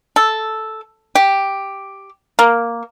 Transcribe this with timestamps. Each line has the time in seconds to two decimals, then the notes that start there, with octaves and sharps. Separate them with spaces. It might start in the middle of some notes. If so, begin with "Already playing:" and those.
0.16 A4
1.15 G4
2.39 A#3